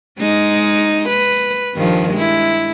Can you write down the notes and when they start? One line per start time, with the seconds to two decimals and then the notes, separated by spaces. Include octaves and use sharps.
0.19 G#3 D#4
1.08 B4
1.74 G2 D#3 F3
2.13 G#3 E4